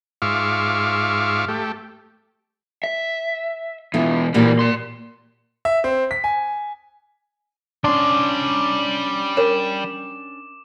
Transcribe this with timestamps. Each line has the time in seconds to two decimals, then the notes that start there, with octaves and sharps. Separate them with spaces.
0.22 G#2 F4 E5 F5 C#6 D6
1.48 A3 G4
2.84 E5
3.94 E2 B2 E4 F4 A4
4.34 A#2 E3 G3 A#3 F#4
4.59 D5 C6
5.65 E5
5.84 C4
6.11 B6
6.24 G#5
7.84 G3 C#4 D4 C6 D6
9.37 A#4 C#5 E7